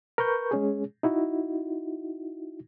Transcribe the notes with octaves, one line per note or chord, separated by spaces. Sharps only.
A#4 B4 C#6 G6
G#3 C#4 G#4
D#4 E4 F#4